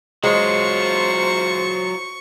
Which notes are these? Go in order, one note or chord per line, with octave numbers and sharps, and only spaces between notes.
F#3 G#3 F4 C5 C#6